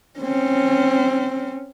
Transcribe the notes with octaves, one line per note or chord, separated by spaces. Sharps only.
C4 C#4